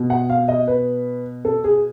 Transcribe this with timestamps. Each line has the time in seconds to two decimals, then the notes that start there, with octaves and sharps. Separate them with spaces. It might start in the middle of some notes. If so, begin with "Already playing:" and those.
Already playing: B2
0.10 F#5
0.30 F5
0.48 D#5
0.67 B4
1.45 A4
1.64 G#4